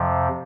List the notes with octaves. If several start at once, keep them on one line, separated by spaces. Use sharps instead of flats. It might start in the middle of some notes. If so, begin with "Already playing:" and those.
Already playing: F2 C3 F3